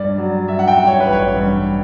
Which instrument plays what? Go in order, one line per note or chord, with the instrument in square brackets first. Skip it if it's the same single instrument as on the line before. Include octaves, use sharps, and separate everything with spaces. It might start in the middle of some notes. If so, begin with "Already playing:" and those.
Already playing: [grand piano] G2 D5
F#3
G2 E5
F#5
G5
G2
C#5
B4
A1
C#5
G2